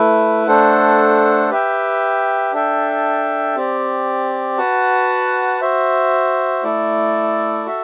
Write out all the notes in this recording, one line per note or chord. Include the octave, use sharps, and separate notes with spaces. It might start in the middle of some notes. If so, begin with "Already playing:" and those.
Already playing: A3 E4 B4
A3 D4 A4 C5 F#5
G4 B4 E5 G5
D4 A4 E5 G5
C4 G4 D5
F#4 B4 F#5 A5
F#4 C5 E5
A3 E4 A4 D5
F#4 A4 E5